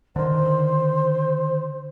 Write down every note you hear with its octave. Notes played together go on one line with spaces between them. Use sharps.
D3 D#3 C5